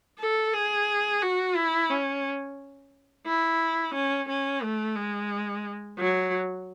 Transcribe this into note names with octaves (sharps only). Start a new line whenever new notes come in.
A4
G#4
F#4
E4
C#4
E4
C#4
C#4
A3
G#3
F#3